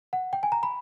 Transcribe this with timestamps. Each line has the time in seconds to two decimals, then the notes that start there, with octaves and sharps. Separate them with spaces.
0.13 F#5
0.33 G5
0.43 G#5
0.52 A#5
0.63 B5